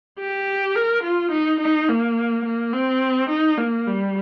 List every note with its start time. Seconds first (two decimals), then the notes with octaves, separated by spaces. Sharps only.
0.19 G4
0.76 A#4
1.03 F4
1.32 D#4
1.60 D#4
1.88 A#3
2.45 A#3
2.73 C4
3.30 D#4
3.58 A#3
3.87 G3